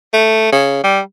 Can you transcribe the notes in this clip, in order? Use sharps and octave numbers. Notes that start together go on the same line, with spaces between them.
A3
C#3
G3